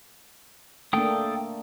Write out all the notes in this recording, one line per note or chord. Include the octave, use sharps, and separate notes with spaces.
A3 A#3 D4 A4 G5 D#6